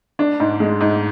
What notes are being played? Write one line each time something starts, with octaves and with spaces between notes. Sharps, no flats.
D4
G#2
G#3
G#2